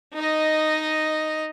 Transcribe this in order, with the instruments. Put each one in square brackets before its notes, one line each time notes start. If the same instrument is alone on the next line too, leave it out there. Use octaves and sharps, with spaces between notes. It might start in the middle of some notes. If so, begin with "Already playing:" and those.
[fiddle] D#4 D#5